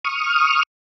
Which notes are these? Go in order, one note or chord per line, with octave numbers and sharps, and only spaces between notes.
C#6 D#6 F6